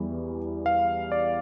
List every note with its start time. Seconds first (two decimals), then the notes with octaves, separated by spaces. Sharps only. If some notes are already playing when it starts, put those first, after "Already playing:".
Already playing: E2 E3 G3
0.66 F5
1.12 D5